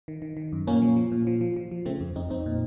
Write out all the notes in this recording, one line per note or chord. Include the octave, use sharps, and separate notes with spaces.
D#3
D#3
D#3
F#2
A#2 A#3 C#4
F3
F3
A#2
F3
F3
F3
F3
C#3 A3 C4
F2
F2 C4 D#4
F2 C4 D#4
A#2